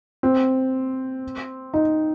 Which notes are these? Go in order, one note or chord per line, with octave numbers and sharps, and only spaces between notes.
C4
D#4